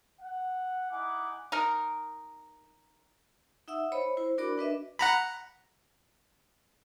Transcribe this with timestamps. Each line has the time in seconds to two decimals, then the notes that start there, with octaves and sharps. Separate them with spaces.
0.21 F#5
0.92 D#4 E4 F#5 G#5 D6
1.52 D#4 A#4
3.68 D#4 E5 F#5 E6
3.92 C5 C#5 D#5 B5
4.17 E4 C5
4.38 D4 F#4 A#4 D5 B5 D6
4.57 D4 B4 D#5 E5
4.99 F#5 A#5 B5